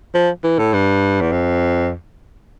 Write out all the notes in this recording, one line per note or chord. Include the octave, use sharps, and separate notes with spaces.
F3
E3
A2
G2
E2
F2